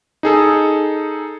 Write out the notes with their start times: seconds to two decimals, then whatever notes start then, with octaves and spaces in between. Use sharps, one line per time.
0.23 D#4 G#4 A4